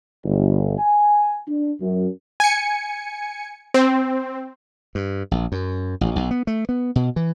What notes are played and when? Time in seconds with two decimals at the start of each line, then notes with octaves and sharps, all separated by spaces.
0.25 G1
0.79 G#5
1.47 D4
1.80 F#2
2.40 G#5 C#7
3.74 C4
4.95 G2
5.31 A#1
5.52 F#2
6.01 A1
6.16 B1
6.31 B3
6.47 A3
6.69 B3
6.96 B2
7.16 E3